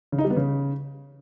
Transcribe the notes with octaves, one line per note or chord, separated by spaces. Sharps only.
C#3
D#4
G3
B3
C#3